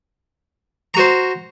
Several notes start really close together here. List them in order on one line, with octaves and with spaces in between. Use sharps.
A#5 F#4 C5